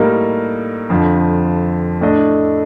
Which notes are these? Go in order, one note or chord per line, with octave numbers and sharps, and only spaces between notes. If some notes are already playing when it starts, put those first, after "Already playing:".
Already playing: A2 G3 A#3 D#4 A#4
F2 D3 F3
A2 A3 D4 A4 D#5